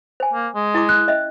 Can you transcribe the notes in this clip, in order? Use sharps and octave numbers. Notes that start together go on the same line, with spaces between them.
C5 G#5
A#3
G#3
E4 D6
F#6
C#4 D#5 E5